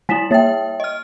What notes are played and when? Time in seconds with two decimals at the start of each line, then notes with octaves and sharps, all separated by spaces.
0.09 G3 E4 G#5 B6 E7
0.31 A#3 C#5 E5 G5 A6
0.80 D#5 F6